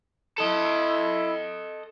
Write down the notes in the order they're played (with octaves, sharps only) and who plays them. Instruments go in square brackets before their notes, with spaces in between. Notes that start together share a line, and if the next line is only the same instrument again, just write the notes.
[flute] E4 [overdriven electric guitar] A4 D#5